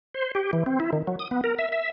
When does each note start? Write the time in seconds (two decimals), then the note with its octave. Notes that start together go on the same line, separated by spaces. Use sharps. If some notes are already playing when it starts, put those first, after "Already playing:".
0.14 C5
0.35 G4
0.53 E3
0.66 C4
0.80 E4
0.93 D#3
1.07 F#3
1.19 D#6
1.31 B3
1.44 A#4
1.59 E5
1.72 E5